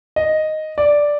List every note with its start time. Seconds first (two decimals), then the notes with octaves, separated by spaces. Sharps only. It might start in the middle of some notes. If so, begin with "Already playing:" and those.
0.16 D#5
0.78 D5